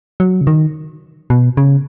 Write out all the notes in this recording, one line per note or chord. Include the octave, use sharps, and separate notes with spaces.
F#3
C#3
D#3
B2
C#3